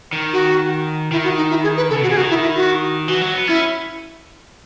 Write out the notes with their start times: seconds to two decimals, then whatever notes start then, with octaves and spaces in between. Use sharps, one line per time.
0.13 D#3
0.33 F#4
1.12 D#3 E4
1.24 F#4
1.37 D#4
1.50 E4
1.63 G#4
1.77 B4
1.90 C#3 A4
2.00 B2 F#4
2.09 C#3 G#4
2.17 F#4
2.19 D#3
2.30 E4
2.42 E4
2.56 F#4
3.08 E3 F#4
3.22 F#3
3.34 B3
3.47 C#4 E4